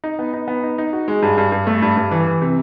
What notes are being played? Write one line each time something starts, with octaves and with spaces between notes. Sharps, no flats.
D#4
B3
D#4
B3
D#4
D#4
F#4
G#3
G2
G2
G2
A3
G2
G2
E3
E3
C3